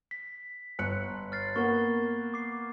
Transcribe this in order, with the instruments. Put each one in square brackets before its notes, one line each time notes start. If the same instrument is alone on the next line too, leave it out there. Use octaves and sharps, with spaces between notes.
[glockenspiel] B6
[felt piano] G1 F#6 C#7
[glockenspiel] F6 A6 C7
[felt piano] A#3 B3 [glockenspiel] C#6 G7
[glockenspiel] D6 C7